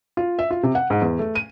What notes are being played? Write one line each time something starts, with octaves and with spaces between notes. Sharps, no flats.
F4
E5
F4
C3
F#5
G#2
E2
A3
D#7